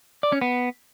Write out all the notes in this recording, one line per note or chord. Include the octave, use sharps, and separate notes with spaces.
D5
C#4
B3